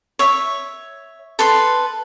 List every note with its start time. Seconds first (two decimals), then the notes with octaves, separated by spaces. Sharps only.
0.19 C#5 E5
1.39 A4 B4 C6